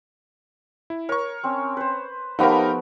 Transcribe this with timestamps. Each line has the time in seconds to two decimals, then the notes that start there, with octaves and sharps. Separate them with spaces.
0.90 E4
1.09 A#4 C#5 C#6
1.44 C4 C#4
1.77 B4 C5
2.39 F3 A3 B3 D#4 G4 A#4 B4